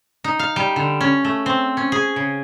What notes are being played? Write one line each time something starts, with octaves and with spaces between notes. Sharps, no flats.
D#4
F5
G3
D3
C#4
A3
C4
C#4
G#4
C#3